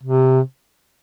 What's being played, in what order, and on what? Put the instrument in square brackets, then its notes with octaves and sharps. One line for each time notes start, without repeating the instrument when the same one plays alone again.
[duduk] C3